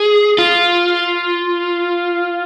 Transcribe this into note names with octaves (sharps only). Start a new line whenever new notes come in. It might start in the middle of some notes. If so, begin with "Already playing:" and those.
Already playing: G#4
F4